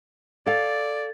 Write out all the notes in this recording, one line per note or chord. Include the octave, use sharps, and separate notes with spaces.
A4 D5 F5 G#6 A6